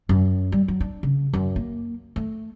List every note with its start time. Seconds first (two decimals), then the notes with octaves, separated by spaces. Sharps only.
0.09 F#2
0.52 G3
0.68 F#3
0.80 D4
1.03 C#3
1.33 F#2
1.56 A#3
2.16 A3